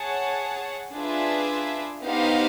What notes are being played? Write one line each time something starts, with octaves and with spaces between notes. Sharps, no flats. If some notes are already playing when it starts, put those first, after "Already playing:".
Already playing: G#4 C#5 F#5 A5
D4 F4 G#4 B4 E5
B3 D#4 G4 C5 F5